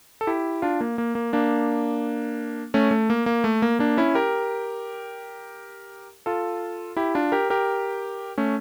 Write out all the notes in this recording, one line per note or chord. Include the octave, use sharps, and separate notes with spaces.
A4
E4 G4
D4 F4
A#3
A#3
A#3
A#3 D4
A3 C#4
A3
A#3
A#3
A3
A#3
A#3 D4
C#4 E4
G4 A#4
F4 A4
E4 G4
D4 F4
G4 A#4
G4 A#4
A3 C#4